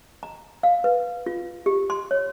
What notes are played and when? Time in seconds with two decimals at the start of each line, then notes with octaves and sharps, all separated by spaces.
0.23 A#5
0.63 F5
0.84 B4
1.26 F4
1.66 G4
1.90 C6
2.11 C#5